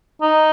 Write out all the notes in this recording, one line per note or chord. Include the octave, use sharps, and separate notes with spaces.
D#4